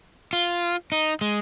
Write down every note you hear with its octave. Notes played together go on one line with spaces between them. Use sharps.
F4
D#4
G#3